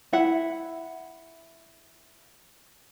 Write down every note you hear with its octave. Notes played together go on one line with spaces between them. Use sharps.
E4 E5 F#5